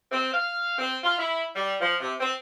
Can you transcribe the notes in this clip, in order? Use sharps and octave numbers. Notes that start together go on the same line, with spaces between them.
C4
F5
C4
F4
E4
G3
F3
C3
C4